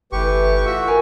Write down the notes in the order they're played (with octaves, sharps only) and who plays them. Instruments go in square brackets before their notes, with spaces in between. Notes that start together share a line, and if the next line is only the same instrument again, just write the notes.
[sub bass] G1 [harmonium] E3 A3 B4 [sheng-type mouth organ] G4 C#6
[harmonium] F4 [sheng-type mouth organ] F#4 E5
[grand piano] A#4 G#5